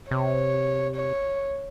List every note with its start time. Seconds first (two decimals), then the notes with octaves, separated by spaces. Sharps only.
0.11 C3 C#5
0.95 C#5